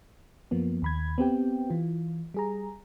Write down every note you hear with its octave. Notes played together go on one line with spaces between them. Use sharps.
F#2 F3 A#3 B3
D#2 B5 G#6
B3 C4 G4 G5
E3 F4
G3 G#4 A#5